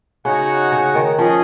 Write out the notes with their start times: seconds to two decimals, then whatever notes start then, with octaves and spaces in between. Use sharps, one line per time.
0.25 C#3 D#4 F#4 C#5 F#5
0.72 C#3
0.95 D#3
1.18 F3 C#4 G#4 D#5